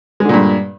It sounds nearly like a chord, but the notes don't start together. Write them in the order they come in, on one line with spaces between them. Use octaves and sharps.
G#3 D3 A#2 G2